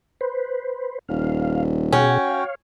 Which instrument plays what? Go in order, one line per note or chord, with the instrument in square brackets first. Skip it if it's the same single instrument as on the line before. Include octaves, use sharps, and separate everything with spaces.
[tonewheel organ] B4 C5
[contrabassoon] D#1 [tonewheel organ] F5
[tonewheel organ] B2 G#4 F#5 [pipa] C#4 [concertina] F#4 G5
[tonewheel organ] C#5 F5